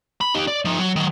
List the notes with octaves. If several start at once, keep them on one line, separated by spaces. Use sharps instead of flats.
B5
D#4 G4
D5
F3 D#4
F#3
D#3 F#3